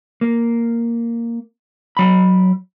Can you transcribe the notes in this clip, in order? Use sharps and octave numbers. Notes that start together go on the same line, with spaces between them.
A#3
F#3 B5